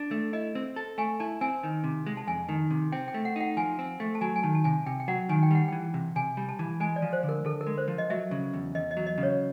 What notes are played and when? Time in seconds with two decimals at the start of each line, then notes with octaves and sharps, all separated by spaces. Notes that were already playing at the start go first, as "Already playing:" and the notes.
Already playing: D4
0.11 A3
0.33 E4 D#5
0.55 C4
0.76 A4
0.98 A3 G#5
1.20 E4 A5
1.41 C4 G#5
1.63 D#3
1.84 C3
2.06 G#3
2.17 A5
2.27 F2 G#5
2.49 D#3
2.71 C3
2.92 C4 G5
3.08 G5
3.14 A3
3.25 F#5
3.36 D#4 F#5
3.57 F3 G#5
3.79 C4
4.00 A3
4.15 A5
4.21 F#3 G#5
4.36 G#5
4.43 D#3 A5
4.55 A5
4.64 C3 G#5
4.86 C3 G5
5.00 G5
5.08 F#3 F#5
5.29 D#3 G#5
5.43 G5
5.51 G3 F#5
5.68 E3 G5
5.94 C3
6.16 C3 G#5
6.37 G3
6.49 A5
6.59 E3
6.80 G#3 G#5
6.96 D5
7.02 F3
7.13 C5
7.23 D3
7.29 A#4
7.45 D3 A4
7.61 A#4
7.67 G#3
7.78 C5
7.88 F3
7.98 D#5
8.10 F#3 E5
8.31 C#3
8.54 E2
8.75 E2 D#5
8.91 D#5
8.97 F#3
9.06 D#5
9.18 C#3
9.23 C#5